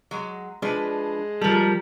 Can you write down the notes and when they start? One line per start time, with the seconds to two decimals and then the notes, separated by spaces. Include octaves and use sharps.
0.11 F#3 G#3
0.62 F3 G#3 D4 B4
1.41 F3 G3 A4 A#4